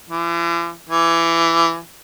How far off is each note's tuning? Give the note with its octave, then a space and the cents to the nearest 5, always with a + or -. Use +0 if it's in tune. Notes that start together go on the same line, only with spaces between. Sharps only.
E3 +45
E3 +20